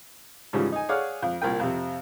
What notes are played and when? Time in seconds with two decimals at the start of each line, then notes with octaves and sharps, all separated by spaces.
0.53 G#2 C#3 E3 F3 G3
0.72 D#4 G#5
0.89 G#4 C#5 D5 F5 F#5
1.22 F2
1.42 C2 A#2 A#4 G5
1.60 F2 C3